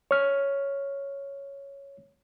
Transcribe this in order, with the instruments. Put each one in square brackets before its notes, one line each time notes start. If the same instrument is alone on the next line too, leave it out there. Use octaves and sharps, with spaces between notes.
[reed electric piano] C#5 F6